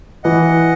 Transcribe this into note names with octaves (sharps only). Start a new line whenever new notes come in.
E3 D#5 F#5